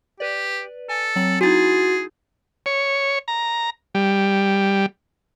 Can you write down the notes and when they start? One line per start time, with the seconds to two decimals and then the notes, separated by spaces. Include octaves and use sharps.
0.20 G4 B4 D5
0.89 A4 G#5
1.16 F#3 C4 F#7
1.41 D#4 E4 F#4 G#4 G#5 A6
2.66 C#5
3.28 A#5
3.95 G3